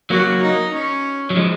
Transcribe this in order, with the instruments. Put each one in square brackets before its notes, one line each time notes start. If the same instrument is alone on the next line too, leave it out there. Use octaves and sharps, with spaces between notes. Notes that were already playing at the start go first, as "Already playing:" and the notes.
[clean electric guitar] F#3 A#3 [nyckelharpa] F#4
[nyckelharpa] D#4
C#4
[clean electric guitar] F#3
F3 G#3